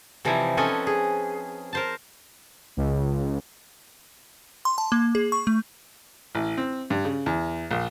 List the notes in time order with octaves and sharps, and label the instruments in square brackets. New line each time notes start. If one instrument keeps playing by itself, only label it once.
[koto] C3 E3 F3 G3 D#4 E4
C4 C#4 A4 B4 D#5 G#5
G#4
A#4 C5 A5
[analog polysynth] C#2
[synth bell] C6
A5
A#3
G#4
C#6
A3
[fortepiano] A1
C4
G2
C#3
E2
A#1